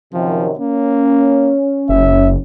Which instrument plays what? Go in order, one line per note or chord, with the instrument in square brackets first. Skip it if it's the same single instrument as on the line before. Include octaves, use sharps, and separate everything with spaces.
[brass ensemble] F#2 C3 D#3 [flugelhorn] F3
[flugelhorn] A#3 [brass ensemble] C#4
[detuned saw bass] F#1 [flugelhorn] E5